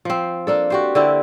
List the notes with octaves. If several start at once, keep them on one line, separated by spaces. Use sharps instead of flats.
F3 C4
A#3 D4 A4
F#4 G4 C5
D3 C4 E4 G4